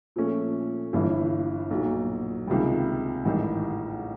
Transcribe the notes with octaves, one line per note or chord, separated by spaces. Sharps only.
A#2 F3 A3 C#4
G1 G2 E3
B1 A#2 F#3
C#2 C3 D#3 G3
A1 G#2 D#3 G3